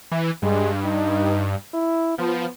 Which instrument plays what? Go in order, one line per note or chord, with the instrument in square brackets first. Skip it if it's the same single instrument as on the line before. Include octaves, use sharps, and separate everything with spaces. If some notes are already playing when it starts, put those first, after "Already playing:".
[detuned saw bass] E3
[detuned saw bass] G2 [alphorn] G#3
[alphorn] D#4
E4
[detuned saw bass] F3 [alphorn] B3